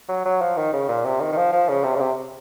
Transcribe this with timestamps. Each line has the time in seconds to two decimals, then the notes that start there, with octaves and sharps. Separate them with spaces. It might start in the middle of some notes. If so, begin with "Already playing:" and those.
0.09 F#3
0.25 F#3
0.41 F3
0.56 D#3
0.73 C#3
0.88 A#2
1.05 C3
1.20 D#3
1.32 D#3
1.37 F3
1.52 F3
1.69 C#3
1.84 C3
1.95 C#3
2.00 C3